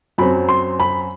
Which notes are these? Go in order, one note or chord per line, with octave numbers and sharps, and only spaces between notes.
F#2 F#3 C4 B5
C6
B5